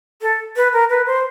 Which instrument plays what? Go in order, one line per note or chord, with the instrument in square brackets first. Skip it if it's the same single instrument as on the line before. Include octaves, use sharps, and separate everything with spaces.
[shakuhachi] A4
B4
A#4
B4
C5